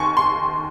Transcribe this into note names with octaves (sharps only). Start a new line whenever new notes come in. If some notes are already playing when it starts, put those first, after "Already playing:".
Already playing: D#2 D#3 G#5 C6 C#6
C6